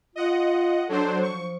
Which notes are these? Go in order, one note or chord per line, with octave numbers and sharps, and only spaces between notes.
F4 D#5 F#5
F#3 D4 A4 C5
F3 C#6